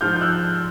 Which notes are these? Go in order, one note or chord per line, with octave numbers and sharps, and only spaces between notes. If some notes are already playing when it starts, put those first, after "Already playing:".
G#2 F3 F6 G6
G6
E6 F#6